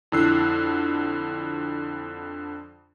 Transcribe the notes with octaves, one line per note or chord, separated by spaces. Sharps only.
F2 D3 E4 E6 F#6 C7